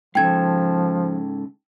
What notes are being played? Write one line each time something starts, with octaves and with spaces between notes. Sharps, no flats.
G#2 C#3 F3 A4 G5 G#6